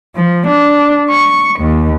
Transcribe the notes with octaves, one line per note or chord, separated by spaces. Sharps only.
F3
D4
C#6
D#2